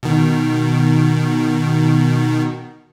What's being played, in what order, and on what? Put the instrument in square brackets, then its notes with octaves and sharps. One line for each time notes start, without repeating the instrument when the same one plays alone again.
[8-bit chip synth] B2 D#3